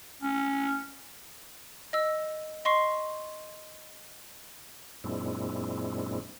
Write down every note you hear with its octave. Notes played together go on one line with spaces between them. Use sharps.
C#4
D#5 E6
D#5 C6 C#6 C7
F#2 A#2 G#3 C4 D4 E4